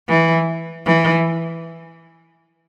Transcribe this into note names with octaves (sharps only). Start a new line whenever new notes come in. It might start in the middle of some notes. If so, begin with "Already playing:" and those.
E3
E3